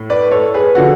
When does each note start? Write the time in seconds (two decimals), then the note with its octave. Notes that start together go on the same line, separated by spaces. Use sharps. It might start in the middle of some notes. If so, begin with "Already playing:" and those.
Already playing: A2 A3
0.10 B4 D5
0.31 A4 C#5
0.54 G#4 B4
0.75 D3 F3 F#4 A4